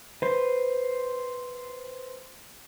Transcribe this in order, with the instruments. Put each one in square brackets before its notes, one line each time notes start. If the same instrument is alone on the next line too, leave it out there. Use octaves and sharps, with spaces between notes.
[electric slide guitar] B4 C5